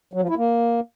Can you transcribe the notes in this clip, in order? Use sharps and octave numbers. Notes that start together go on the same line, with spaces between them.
F#3
F3
E4
A#3